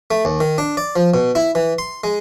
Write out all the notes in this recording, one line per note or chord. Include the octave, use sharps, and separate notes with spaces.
A3
D#2
D#3
D4
D5
F3
B2
E4
E3
C6
G#3